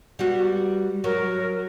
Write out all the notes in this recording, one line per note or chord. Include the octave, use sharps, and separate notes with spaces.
G3 B3 F#4
F#3 A#4